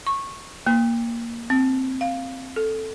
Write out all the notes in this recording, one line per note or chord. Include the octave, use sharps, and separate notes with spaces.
C#6
A#3
C4
F5
A4